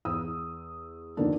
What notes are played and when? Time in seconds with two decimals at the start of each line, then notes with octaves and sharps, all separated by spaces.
0.05 E2 D#6 E6
1.17 F2 D3 D#3 A#3 D4